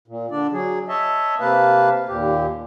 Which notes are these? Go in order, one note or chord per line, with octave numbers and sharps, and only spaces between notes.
A#2
D3 D4 D5
F#3 G#4
C#5 D#5 E5 A5
C3 A#3 B4 F5 A5
D#2 A#2 G4